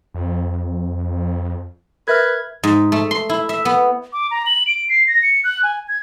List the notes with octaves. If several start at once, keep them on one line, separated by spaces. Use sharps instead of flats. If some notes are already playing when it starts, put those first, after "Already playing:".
F2
A#4 B4 E5 F6 G#6
G#2
A3
C6
E4
E5
B3
D6
A#5
F#7
D7
C7
A#6
C#7
F#6
G#5
G#6